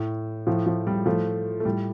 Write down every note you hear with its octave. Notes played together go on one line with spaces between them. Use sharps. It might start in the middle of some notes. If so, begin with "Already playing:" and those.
Already playing: A2
A2 F3
F3
G3
A2 F3 A3
A3
A2 G3